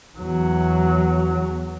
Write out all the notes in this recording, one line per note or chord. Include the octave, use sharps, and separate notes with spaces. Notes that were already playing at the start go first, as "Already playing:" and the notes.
E2 F#3